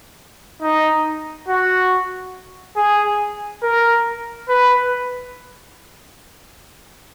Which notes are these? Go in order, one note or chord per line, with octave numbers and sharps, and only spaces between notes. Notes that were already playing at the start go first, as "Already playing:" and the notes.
D#4
F#4
G#4
A#4
B4